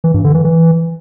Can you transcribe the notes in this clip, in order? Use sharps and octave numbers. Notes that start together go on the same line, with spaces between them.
E3
G2
D3
E3
E3